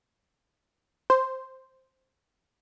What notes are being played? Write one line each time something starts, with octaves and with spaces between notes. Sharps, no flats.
C5